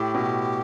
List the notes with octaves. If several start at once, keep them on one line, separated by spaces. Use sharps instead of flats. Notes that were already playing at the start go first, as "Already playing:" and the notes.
Already playing: A2 G4
B2